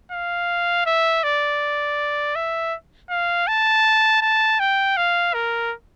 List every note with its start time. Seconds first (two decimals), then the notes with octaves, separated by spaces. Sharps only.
0.12 F5
0.86 E5
1.24 D5
2.36 E5
3.10 F5
3.48 A5
4.22 A5
4.60 G5
4.97 F5
5.34 A#4